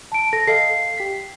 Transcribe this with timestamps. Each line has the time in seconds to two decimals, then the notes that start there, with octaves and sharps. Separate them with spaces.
0.12 A5 D7
0.33 A4 A#6
0.47 A4 D#5 F5 C7
0.97 G4 B6